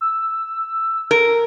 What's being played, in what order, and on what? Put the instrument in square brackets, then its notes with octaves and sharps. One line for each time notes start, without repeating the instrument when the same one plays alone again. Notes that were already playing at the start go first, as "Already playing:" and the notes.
[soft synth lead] E6
[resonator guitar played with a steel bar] A#4